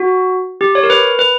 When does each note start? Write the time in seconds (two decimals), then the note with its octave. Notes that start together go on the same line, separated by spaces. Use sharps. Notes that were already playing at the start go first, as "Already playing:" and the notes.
Already playing: F#4
0.61 G4
0.75 C#5
0.83 A#4
0.90 B4
1.19 B4